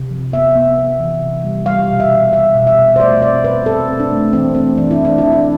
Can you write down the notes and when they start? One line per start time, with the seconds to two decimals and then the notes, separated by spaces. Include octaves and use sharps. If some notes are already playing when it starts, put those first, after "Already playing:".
Already playing: C3
0.11 F3
0.33 B3 E5
0.55 B3
0.78 B3
1.00 E3
1.22 C3
1.44 G3
1.66 G3 F5
1.89 B2
2.00 E5
2.11 B2
2.33 B2 E5
2.55 B2
2.67 E5
2.78 B2
2.96 C5
3.00 A3 D5
3.22 C4 D5
3.44 B2 B4
3.66 C4 A4
3.89 C4
3.99 D4
4.11 A3
4.33 E3 C4
4.55 A3 C4
4.77 E3 D4
4.91 E4
4.99 E3
5.05 D4
5.18 E3 E4
5.32 D4